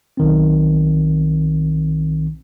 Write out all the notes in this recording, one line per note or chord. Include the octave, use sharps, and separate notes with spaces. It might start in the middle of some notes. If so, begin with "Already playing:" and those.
B1 D#3 C4